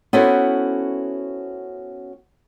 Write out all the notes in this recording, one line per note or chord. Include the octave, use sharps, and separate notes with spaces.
B3 C#4 E4 F#4 A4 C5